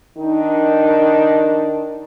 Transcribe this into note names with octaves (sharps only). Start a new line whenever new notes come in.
D#3 D4 D#4